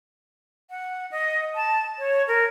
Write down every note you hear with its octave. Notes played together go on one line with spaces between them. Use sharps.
F#5
D#5
A5
C#5
A#4